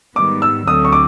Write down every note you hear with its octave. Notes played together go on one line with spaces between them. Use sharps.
G#2 D#3 G3 B3 D6
E6
D2 D3 F#3 A3 C4 D#6
C#6
D6